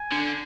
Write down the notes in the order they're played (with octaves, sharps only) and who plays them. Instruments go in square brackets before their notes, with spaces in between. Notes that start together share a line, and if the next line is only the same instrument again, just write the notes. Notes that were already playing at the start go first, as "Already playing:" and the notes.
Already playing: [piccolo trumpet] G#5
[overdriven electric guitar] D3